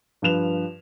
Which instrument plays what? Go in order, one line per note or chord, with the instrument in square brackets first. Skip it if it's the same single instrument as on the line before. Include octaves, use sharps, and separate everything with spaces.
[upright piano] G2 F3 B4 E7 F7